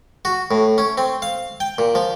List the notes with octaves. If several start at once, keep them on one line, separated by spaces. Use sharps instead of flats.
F#4
A2
C#4
C4
F5
G5
A#2
F3